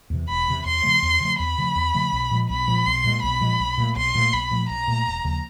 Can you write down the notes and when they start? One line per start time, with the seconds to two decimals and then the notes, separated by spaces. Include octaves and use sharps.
0.10 E2 C3 E3
0.28 E1 B5
0.48 E2 C3 E3
0.65 E2 C6
0.83 C#3 F3 A3
1.02 E2
1.20 C#3 F3 A3
1.39 E2 B5
1.58 C#3 F3 A3
1.75 E2
1.95 C#3 F3 A3
2.12 B1
2.31 A#2 F3 G#3
2.50 B1 B5
2.67 A#2 F3 G#3
2.86 B1 C6
3.04 A#2 F3 G#3
3.22 B1 B5
3.41 A#2 F3 G#3
3.60 B1
3.78 A#2 F3
3.82 A3
3.96 B1 C6
4.15 A#2 F3
4.18 A3
4.33 B1 B5
4.51 A#2 F3 A3
4.70 B1 A#5
4.87 A#2 F3 A3
5.07 E1
5.25 D#2 C#3 F3